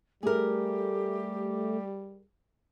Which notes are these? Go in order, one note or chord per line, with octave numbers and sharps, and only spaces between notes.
G3 A3 G4 G#4 A#4